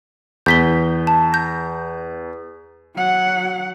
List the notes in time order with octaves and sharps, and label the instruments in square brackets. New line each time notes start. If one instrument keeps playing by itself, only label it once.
[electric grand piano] E2 [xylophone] G6 B6 G7
[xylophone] A5
G6 A#6
[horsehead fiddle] F#3 F#5